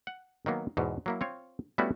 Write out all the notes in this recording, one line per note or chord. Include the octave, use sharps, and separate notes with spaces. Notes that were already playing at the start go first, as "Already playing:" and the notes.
F#5
D#3 F#3 A#3 B3
E2 G#2 B2
F#3 A#3 E4
C4 F4 C#5
G3 A3 B3 C#4 E4 F#4